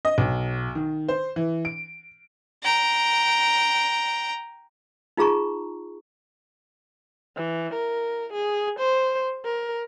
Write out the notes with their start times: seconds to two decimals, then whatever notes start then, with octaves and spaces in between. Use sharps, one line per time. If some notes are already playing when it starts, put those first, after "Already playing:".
0.05 D#5
0.18 B1
0.75 D#3
1.09 C5
1.36 E3
1.65 D7
2.63 G5 A#5
5.17 D#4 F4 G#4 A#5 C#6
7.36 E3
7.74 A#4
8.33 G#4
8.79 C5
9.45 A#4